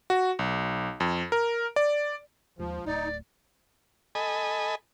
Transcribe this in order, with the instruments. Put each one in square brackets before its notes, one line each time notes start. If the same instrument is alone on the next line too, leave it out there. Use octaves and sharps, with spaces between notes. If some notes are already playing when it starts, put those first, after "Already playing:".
[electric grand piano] F#4
B1
F2
A#4
D5
[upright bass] D#2 G#3 [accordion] F3
[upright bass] D1 [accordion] D#4 [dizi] D5
[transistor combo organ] A4 D#5 G#5 B5